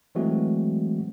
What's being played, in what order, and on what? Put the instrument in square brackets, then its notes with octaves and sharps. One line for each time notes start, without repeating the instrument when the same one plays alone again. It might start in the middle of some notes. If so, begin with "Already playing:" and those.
[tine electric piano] E3 F#3 G#3 A3 C4 F#4